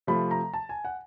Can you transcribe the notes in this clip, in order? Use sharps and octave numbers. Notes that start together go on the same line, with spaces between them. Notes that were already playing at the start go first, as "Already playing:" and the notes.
C3 F3 A3 B5
A#5
A5
G#5
F#5